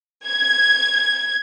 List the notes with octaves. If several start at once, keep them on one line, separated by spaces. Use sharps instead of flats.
G#6